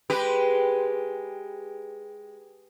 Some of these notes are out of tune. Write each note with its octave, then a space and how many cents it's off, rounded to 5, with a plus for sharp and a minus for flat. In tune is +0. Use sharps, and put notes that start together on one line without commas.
G#3 +0 G4 +0 B4 +0